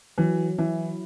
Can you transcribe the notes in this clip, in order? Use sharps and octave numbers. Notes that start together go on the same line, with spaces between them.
E3 F#3
E3 E4